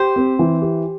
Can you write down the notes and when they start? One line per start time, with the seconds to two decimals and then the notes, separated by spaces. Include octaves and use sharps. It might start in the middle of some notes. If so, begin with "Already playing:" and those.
Already playing: G4 C5
0.16 C4
0.39 E3
0.62 G4